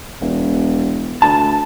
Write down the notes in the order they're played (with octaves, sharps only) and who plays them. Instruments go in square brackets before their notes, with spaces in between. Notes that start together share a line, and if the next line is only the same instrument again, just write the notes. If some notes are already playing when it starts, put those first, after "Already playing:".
[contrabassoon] E1
[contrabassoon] D2 [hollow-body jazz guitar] A5